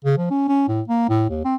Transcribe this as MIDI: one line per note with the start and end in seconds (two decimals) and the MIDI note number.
0.04 0.17 49
0.18 0.29 53
0.30 0.47 61
0.48 0.63 61
0.68 0.81 45
0.88 1.05 58
1.09 1.26 45
1.29 1.41 39
1.45 1.55 60